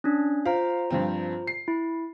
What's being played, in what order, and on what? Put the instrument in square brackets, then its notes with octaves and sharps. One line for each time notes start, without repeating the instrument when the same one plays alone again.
[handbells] C#4 D4
[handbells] F4 C5 A#5 [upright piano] F5
[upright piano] G2 F3 C4
C7
[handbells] E4